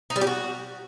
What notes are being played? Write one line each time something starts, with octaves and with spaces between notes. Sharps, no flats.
D#4
G3
G4
F#4